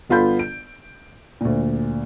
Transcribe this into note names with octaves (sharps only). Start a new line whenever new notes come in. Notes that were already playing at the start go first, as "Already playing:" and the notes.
G1 B3 F4 A4 B5 G6
D7
D2 A#2